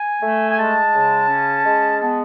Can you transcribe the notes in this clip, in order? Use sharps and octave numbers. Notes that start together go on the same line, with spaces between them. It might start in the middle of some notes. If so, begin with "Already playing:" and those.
Already playing: G#5
A3
G#5
G#3 A5
C#3
C#4
G#3
B3 A5